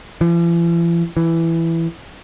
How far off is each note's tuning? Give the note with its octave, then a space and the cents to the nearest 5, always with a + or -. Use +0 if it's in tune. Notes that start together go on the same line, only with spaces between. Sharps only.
E3 +45
E3 +5